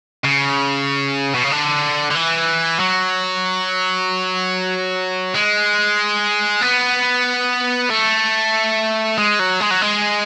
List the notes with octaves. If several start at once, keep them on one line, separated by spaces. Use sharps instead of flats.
C#3
B2
C#3
D3
D3
E3
F#3
G#3
B3
A3
G#3
F#3
G#3
F#3
G#3